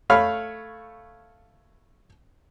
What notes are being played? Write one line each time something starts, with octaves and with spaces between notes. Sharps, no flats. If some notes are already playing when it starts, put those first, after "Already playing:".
A3 C#5 F5 B5 F6